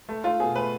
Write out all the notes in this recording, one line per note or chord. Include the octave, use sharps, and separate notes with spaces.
A3
A3 F4
B2 G#4
A3 B4